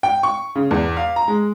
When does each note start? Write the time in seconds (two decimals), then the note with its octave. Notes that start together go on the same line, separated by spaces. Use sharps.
0.03 G5
0.23 C#6
0.55 C#3
0.71 E2
0.97 F5
1.16 A#5
1.28 G#3